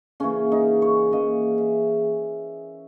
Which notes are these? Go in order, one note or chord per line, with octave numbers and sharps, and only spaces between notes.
C#3 E3 A#3 C#4
D#4
C#5
C#3 E3 A#3 D#5
E5